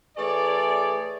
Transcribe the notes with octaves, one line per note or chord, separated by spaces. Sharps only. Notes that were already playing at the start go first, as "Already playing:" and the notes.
E3 A3 G#4 C#5 D5